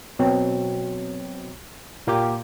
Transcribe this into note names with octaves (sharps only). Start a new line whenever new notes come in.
B2 F#3 C4
A#2 A#3 F4 G4